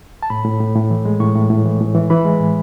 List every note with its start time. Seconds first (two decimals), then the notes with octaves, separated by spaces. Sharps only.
0.23 A5
0.30 A2 B5
0.45 A2
0.60 A2
0.76 A2
0.91 E3
1.05 G#3
1.20 A2 C#6
1.35 A2
1.50 A2
1.66 E3
1.80 A2
1.95 E3
2.10 E3 B5
2.25 G#3
2.40 A2